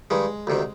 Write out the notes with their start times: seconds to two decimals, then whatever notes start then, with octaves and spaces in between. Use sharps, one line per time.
0.10 G2 D#3 G#3
0.47 D2 C3 D#3